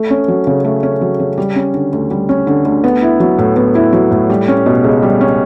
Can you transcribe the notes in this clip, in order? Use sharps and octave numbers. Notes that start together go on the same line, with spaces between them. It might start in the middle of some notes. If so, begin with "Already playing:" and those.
Already playing: A3
C#4
F#3
C#3
A3
C#4
F#3
C#3
G3
C#4
D3
D2
G3
C#4
D3
D2
B3
E4
F#3
A2
B3
E4
F#3
A2
G3
C#4
B2
C#2
G3
C#4